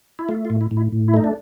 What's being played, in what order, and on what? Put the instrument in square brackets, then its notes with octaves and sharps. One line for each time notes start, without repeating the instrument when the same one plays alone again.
[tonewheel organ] E4
A3 F4
F4
A2
E4
A2
E4
A2
E4
A3 D#4
D4